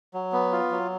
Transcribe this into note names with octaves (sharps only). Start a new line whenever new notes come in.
F#3
B3
F4
F#3